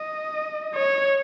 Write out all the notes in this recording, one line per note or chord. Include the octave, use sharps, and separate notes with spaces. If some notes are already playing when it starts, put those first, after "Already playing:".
Already playing: D#5
C#5